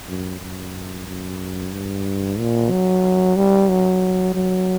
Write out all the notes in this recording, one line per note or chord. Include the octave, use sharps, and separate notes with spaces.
F#2
F#2
F#2
G2
A#2
F#3
G3
F#3
F#3